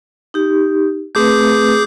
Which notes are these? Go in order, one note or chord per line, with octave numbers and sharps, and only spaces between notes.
D#4 G4
A3 C4 G#4 B4 D6 G6